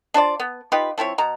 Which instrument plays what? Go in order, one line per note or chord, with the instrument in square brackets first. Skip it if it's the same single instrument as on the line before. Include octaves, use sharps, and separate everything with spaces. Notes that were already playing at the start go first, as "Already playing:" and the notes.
[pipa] D4 F4 C5 D5
B3
D#4 F4 G4 B4
F3 C4 E4 C#5
B2 A#5